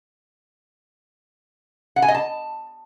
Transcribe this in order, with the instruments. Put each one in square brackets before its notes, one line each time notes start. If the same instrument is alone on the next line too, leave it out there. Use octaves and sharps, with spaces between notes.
[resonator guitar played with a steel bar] F#5
G#5
D#5
A5